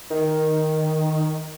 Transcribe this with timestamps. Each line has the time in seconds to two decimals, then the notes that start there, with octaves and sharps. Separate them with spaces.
0.10 D#3